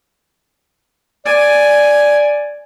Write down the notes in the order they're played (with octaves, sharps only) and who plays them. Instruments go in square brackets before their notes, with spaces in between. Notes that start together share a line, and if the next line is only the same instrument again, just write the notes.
[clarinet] D5 [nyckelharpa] G#5